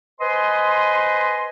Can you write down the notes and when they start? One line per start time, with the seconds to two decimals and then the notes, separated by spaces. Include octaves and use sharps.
0.20 B4 C5 D#5 G#5 C6